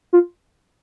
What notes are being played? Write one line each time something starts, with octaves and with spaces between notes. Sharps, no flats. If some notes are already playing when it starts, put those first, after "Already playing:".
F4